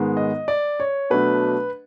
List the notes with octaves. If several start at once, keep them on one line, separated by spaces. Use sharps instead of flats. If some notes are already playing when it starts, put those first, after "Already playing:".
Already playing: G#2 D#3 G#3 B3
D#5
D5
C#5
B2 F#3 A3 D4 B4